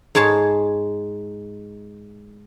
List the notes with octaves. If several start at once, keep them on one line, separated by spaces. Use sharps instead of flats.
G#2 G#3 C#5 A5